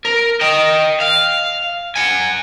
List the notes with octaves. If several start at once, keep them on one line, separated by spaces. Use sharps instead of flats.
A#4
D#5 G5
F5
F#5 G#5